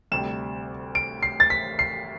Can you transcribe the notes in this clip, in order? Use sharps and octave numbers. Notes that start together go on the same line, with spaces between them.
D2 C3 G3 E7
D7
C7
A6
B6
C7